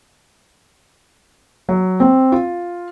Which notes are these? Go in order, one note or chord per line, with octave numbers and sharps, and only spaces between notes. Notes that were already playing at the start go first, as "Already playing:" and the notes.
F#3
C4
F4